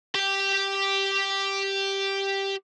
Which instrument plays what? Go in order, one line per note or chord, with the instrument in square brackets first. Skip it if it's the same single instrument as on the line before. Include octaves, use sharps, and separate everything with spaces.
[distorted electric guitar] G4 G5